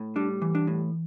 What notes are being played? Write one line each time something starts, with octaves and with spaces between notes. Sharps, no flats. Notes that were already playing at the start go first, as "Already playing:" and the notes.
Already playing: A2
G3 D4
E3
D4
A2